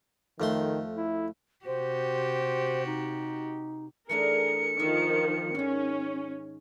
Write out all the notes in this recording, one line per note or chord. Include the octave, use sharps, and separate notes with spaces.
F2 D#3 A3 C6
E4
C3 F#4 G4 C5
D#4
E3 A3 D4 G#4 A#4 C#7
D#3 F3 E5
G#2 D#3 C#4